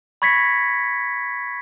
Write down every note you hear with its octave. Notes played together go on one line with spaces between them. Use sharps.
B5 C#6 G#6 A#6 B6 C#7